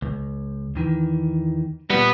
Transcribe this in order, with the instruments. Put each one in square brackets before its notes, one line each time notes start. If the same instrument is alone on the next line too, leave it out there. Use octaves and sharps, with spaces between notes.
[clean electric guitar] C#2
E2 D#3 E3
[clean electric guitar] A#2 G3 [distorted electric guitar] B3